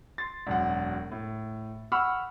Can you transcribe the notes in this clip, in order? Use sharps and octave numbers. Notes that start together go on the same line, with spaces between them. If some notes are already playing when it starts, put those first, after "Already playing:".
C6 A6
E1 F#2 F#5
A2
F#5 B5 C#6 E6 F6